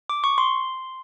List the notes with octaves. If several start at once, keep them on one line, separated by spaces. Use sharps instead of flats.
D6
C#6
C6